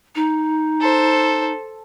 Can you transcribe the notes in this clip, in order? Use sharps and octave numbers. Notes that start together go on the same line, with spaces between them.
D#4
A4 C5